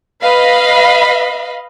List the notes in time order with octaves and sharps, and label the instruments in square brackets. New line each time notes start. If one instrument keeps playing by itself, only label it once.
[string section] B4 D#5 F5 B5